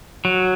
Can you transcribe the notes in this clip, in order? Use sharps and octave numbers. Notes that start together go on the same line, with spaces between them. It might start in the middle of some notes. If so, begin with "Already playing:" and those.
F#3